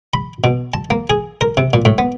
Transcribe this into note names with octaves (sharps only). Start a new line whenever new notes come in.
B5
B2
A5
A#3
G#4
A#4
C3
A#2
A2
B3